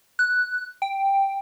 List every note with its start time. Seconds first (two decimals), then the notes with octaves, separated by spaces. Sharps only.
0.19 F#6
0.82 G5